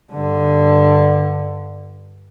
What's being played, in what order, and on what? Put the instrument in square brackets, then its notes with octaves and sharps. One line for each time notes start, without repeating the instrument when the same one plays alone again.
[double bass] G2 D3